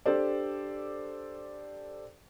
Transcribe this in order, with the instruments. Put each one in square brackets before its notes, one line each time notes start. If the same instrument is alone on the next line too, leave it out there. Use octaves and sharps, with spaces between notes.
[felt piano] D4 G4 A4 C5 D5